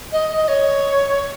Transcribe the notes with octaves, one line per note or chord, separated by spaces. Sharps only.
D#5
D#5
C#5